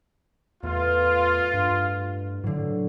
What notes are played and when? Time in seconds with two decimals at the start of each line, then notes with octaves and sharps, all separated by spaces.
0.63 A1 E2 F4
1.54 G2
2.44 A2 D3 F#3